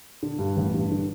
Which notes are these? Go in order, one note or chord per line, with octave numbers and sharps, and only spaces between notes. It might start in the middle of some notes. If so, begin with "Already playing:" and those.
D3
G2
A1
G2
D3